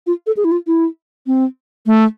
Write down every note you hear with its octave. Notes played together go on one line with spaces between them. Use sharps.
F4
A4
G#4
E4
F4
E4
C4
A3